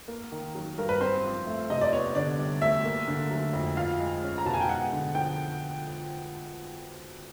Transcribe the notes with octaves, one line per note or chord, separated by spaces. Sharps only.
A#3
D#3
F#3
G2 A#4
B4
C4 C5
F3
A3
C3 D#5
D5
B3 C#5
D3 D5
G3
D2 E5
A#3
D3
F#3
F2
F4 F5
G#3
C#4
A#5
B2 A5
G#5
G5
G#3 F#5
D3
F3 G5